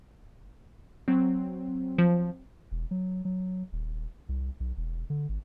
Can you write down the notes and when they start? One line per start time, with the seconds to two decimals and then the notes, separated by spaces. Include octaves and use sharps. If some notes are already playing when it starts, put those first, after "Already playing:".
1.08 F#3 C4
1.98 F3
2.72 E1
2.91 F#3
3.25 F#3
3.73 D#1
4.29 C2
4.60 B1
4.77 E1
5.10 D3
5.29 G#1